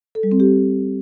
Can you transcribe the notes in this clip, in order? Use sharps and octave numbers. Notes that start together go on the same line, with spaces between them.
A4
G3
C4
G4